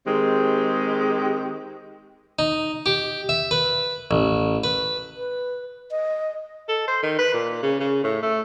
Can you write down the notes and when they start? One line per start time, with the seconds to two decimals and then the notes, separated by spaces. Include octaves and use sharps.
0.07 D#3 G#3 C4 G4 G#4
2.39 D#4
2.86 G4
3.29 E5
3.51 B4
4.11 A1
4.64 B4
5.17 B4
5.91 D#5
6.68 A4
6.88 C5
7.03 D#3
7.18 B4
7.34 A#2
7.63 C#3
7.80 C#3
8.04 A2
8.22 A3